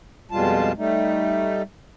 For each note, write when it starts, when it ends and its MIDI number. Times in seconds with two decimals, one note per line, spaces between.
0.31 0.72 41
0.31 0.72 47
0.31 0.72 55
0.31 0.72 56
0.31 0.72 65
0.31 0.72 81
0.77 1.62 55
0.77 1.62 57
0.77 1.62 63